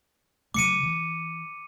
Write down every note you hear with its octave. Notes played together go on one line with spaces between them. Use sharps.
C#3 F#3 A3 D6 C#7 D#7
E3